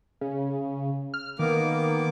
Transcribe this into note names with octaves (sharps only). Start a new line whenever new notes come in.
C#3
F6
D#3 A#3 B3 D6